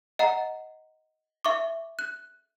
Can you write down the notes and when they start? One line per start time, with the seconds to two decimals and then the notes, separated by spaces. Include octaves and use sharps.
0.19 D#5 F#5 A#5
1.45 E5 C#6 D6
1.99 F#6